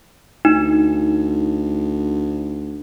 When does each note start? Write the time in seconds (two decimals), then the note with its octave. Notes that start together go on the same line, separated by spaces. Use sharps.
0.45 D2 D#4